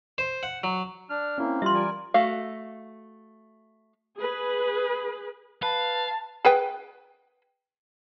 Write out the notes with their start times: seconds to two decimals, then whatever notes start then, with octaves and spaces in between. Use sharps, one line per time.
0.18 C5
0.43 F#5
0.63 F#3
1.10 D4 F6
1.38 A#3 C4 C#4 E4
1.62 G3 F4 E5 C6
1.74 A#4 D5 G#5
2.14 A3 F#4 F5
4.19 G#4 B4
5.63 B4 F5 A5
6.45 G#4 B4 G5